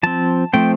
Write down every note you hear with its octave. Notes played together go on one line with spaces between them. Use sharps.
F3 C4 A5
F3 A3 C4 G5